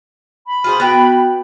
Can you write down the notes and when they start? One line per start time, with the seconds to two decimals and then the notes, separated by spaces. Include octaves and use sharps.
0.47 B5
0.64 F4 G#4 C5
0.80 B3 F#4 G5